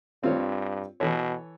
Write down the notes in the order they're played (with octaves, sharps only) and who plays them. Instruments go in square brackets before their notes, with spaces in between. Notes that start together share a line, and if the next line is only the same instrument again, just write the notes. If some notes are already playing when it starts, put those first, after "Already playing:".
[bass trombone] G2 [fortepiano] C4 F4 C#5
[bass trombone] B2 [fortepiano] E3 A4 C#5